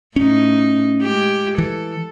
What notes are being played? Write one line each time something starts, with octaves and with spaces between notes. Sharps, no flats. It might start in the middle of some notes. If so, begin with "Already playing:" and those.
A2 C#4 D#4
G#3 G4
E3 A4